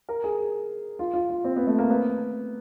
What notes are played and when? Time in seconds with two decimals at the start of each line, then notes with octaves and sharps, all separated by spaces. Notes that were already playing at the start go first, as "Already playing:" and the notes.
0.09 A#4
0.24 G#4
0.99 F4
1.14 F4
1.30 F4
1.44 C4
1.56 B3
1.67 A3
1.79 A#3
1.90 B3